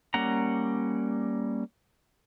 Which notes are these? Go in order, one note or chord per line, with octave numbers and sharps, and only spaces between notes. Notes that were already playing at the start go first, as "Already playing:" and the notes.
G3 A#3 C#4 F#5 A#5